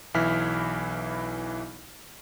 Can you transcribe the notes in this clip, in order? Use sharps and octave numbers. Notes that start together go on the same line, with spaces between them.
B1 E3 E4 F6 B6